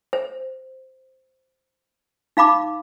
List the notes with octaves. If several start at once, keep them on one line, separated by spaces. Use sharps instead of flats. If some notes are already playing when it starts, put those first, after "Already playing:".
C5
D#4 F5 B5 D6